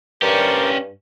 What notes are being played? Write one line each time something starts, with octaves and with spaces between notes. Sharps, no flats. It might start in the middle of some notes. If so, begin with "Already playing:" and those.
G2 C#4 G4 A#4 C5 D5